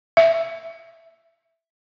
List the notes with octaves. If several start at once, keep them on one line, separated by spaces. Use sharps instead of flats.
E5